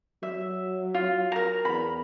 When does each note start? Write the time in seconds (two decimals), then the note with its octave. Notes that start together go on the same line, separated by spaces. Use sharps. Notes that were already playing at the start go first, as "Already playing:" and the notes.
0.23 F#3 E5
0.94 F4
1.32 A#4 A#5
1.65 E2 B5